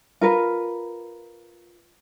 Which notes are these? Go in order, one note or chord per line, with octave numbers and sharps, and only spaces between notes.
F4 A#4 B4